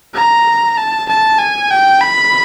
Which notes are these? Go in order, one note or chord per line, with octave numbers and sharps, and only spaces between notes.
A#5
A5
A5
G#5
G5
B5